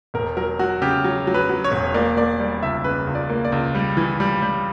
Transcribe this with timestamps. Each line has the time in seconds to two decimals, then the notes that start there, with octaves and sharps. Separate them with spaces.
0.14 E1 A#4
0.37 F#3 A#4
0.59 F#3 F#4
0.82 C#3 G4
1.04 F#3
1.27 F#3
1.34 B4
1.49 F#3
1.64 C#5
1.72 E1
1.94 A#3 D5
2.17 A#3 D5
2.40 G3 D5
2.63 C#2 E5
2.84 C#3 B4
3.07 C#2
3.15 D5
3.30 A#3
3.45 D5
3.52 C#2
3.75 G3
3.97 E3
4.20 G3
4.42 G3